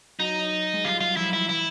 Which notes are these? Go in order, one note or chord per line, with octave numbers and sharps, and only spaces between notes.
F#3 D#4
F#3
G#3
G3 F4
F4
F3 E4
F#3
F3 E4
E3 E4